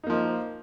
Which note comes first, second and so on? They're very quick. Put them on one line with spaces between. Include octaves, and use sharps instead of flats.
D#4 A#3 F3